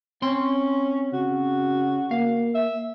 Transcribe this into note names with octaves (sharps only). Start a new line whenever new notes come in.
C4 C#4 C6
C#3 F#4
A#3 F5
E5